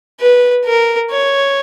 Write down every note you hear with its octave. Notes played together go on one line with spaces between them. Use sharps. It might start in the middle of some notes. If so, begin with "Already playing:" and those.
B4
A#4
C#5